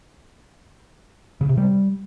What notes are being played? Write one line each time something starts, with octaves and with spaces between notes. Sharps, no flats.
C#3
C3
G3